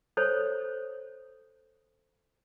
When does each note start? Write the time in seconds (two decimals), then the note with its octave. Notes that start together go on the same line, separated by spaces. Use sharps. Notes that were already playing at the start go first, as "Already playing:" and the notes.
0.17 A4 C5 C#5